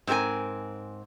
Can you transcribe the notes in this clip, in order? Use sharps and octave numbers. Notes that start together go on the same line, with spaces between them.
G#2 C4 G#4 A#4 G#5